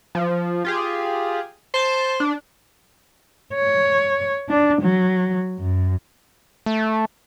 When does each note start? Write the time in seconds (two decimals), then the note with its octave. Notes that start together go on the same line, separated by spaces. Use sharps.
0.15 F3
0.65 F4 G4 G#4
1.74 C5 A5 G6
2.20 D4
3.54 C#5
4.49 D4
4.82 F#3
5.59 F#2
6.66 A3